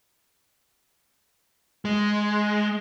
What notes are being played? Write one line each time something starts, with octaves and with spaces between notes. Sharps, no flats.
G#3